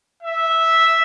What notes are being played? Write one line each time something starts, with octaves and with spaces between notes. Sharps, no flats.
E5